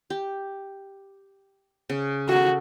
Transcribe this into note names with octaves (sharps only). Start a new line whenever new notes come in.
G4
C#3
F#4 A4